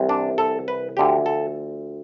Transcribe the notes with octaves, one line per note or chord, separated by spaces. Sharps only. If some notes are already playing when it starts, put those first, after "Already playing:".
Already playing: C2 C3 E3
D4
A4
B4
D2 D3 F3 G4
A4